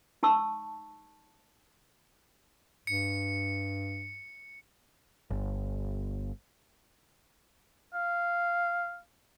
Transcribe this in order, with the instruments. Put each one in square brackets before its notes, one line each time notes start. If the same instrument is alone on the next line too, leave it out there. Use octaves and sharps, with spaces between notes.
[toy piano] D#4 A5 C#6 E6
[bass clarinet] G2 [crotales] C#7
[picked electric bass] G1
[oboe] F5